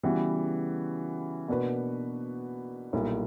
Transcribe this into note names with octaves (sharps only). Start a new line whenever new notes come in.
C#3 E3 G3 B3 F#4
B2 A#3 D4 F#4 B4
B1 A#2 G3 A#3 E4